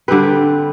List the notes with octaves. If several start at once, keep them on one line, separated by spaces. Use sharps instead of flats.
D3 G3 C4 B4